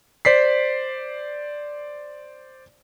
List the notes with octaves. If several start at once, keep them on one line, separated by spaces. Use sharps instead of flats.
C5 D5 B6 C7